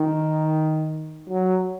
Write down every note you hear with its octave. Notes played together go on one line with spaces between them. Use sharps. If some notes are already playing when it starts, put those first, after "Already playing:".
Already playing: D#3
F#3